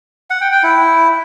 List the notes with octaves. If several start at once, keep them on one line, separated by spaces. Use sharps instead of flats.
F#5
G5
G5
E4